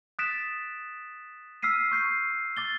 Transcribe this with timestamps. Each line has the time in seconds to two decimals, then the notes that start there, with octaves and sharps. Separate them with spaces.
0.19 D#6 F#6 A6 B6 D7 E7
1.63 E6 F6 B6 C7 D#7
1.91 C#6 G6 C7
2.57 D6 A6 G7